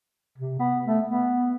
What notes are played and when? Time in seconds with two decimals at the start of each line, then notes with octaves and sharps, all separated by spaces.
0.38 C3
0.59 B3
0.86 A3
1.07 B3